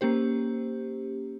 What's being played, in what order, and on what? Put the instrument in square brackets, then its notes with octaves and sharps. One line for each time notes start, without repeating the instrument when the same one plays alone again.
[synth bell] A#3 C#4 G4 C5